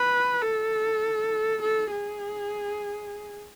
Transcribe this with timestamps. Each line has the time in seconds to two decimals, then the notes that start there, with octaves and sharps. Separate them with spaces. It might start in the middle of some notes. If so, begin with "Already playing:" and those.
Already playing: B4
0.42 A4
1.61 A4
1.91 G#4